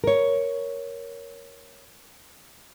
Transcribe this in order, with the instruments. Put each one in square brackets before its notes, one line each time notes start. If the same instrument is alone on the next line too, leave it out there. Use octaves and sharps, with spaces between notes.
[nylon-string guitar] A#4 C#5